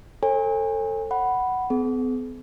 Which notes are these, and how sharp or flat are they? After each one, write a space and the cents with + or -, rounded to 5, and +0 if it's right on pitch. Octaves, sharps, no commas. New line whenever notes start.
A4 +25 C#5 -45 G#5 -35
F#5 +10 B5 +0
B3 +45 G#4 +45